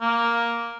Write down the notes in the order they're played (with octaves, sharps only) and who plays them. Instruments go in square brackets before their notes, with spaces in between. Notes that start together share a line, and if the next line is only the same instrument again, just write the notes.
[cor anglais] A#3